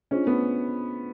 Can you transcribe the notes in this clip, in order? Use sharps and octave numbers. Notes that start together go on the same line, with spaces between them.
C#4 D4 F4 G#4 C5 D#5
B3